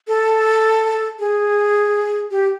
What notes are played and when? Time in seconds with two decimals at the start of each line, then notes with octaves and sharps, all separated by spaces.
0.08 A4
1.19 G#4
2.31 G4